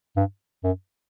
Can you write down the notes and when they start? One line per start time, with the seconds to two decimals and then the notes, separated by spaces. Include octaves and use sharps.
0.16 G2
0.64 F#2